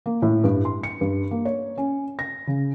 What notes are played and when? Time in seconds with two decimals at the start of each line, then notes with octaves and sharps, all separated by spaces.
0.06 A#3
0.22 A2
0.44 G2
0.65 C6
0.83 C#7
1.01 G2
1.31 A#3
1.45 C#5
1.77 C#4
2.19 A#6
2.47 C#3